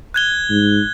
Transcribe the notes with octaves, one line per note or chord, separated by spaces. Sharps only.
F#6 G#6 G7
G#2